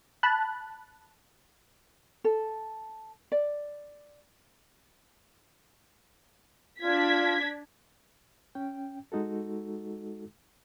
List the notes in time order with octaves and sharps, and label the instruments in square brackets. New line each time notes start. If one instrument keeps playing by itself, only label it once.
[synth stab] A5 B5 F#6
[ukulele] A4
D5
[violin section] D4 G#6 B6 [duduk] F4
[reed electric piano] C#4 G5
G#3 D#4 F#4 A4